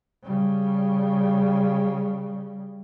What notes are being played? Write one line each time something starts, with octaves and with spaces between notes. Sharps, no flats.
C#3 G3